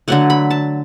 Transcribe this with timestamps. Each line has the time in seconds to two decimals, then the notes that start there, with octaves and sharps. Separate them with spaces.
0.08 D3 F#3 A3 F#5
0.30 B5
0.50 A5